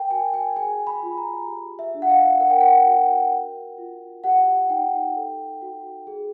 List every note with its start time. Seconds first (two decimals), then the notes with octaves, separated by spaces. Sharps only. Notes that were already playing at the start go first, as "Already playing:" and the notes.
Already playing: A#4 G5
0.11 F#4 G#5
0.34 G#5
0.56 G#4 G#5
0.87 B5
1.03 F4
1.18 A#5
1.48 G4
1.79 E5
1.95 D4
2.02 F#5
2.10 F5
2.40 A#4 F#5
2.50 G5
2.60 F#5
2.86 F#4
3.32 A#4
3.78 F4
4.24 G4 F#5
4.70 D#4 G5
5.16 A4
5.62 F#4
6.07 G#4